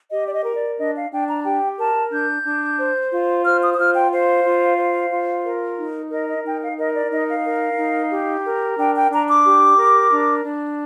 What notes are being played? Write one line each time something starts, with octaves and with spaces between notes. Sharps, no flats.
G4 D#5
D5
D#5
A#4
D5
D4 D#5
F5
D4 G5
A#5
G4 G5
A#4 A5
D4 G6
D4
C5
F4
C5 F6
D#6
D#6
F4 F6
G5
C5 F5
F4
C5
F4
A#4
D#4
A#4 D#5
D#5
D#4 G5
F5
A#4 D#5
D5
D#4 D#5
F5
A#4
D#4
G4
A#4
D4 G5
G5
D4 A#5
D6
G4
A#4
D4
D4